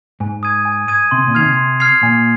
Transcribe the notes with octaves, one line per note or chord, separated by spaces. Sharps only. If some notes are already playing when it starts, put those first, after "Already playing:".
G#2 G#5
D#6 G#6 D#7
G#5
D#6 G#6 D#7
C3 C6
A#2
D#3 F6 G#6 C7 F7
C3
C6
F6 G#6 C7 F7
A#2 G#5